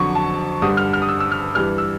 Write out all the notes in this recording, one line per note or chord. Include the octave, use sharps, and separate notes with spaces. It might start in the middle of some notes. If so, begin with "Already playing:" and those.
Already playing: F2 D3 F#3 C#6
A5
G2 D3 G3 D#6
F6
F6
D#6
E6
E6
F6
G2 E3 G3 F6
E6